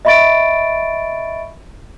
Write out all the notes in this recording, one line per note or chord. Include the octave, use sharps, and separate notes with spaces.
D#5 E5 B5 C#6 A6 D7